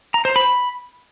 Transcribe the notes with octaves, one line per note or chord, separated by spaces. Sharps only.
A#5
C5
B5